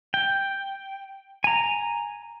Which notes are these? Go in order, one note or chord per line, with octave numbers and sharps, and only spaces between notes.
G5
G#5 A#5